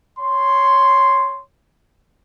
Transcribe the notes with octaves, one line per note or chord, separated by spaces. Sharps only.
C#5 C6